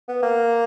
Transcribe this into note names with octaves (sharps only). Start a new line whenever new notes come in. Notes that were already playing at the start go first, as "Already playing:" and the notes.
B3
A#3